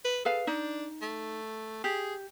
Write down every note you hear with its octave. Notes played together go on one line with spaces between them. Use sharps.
B4
G#4 A4 B4 F5
D4 D#4
A3
G4 G#4